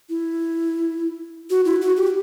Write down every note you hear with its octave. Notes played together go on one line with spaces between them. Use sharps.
E4
F#4
E4
F#4
G4